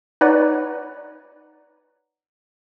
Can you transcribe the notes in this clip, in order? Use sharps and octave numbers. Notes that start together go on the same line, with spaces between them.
D#4 B4 C#5 D5 F#5 A#5